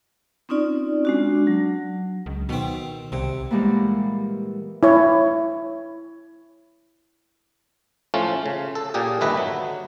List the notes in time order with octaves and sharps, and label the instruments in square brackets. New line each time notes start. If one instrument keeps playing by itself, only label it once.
[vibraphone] C4 C#4 D#4 F4 D5
G#3 D4 F#4
F#3
[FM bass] C#2
[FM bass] B2 [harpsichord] D#3 C4
[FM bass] C2 [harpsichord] C3
[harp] A#2 E3 G3 G#3 A#3 B3
[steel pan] E4 C#5
[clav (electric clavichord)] A2 F3 A3 C#4 F4
C#3
A4
A#2 A#3 G4 G#4
G1 D#2 A3 B4 D#5 E5
F#3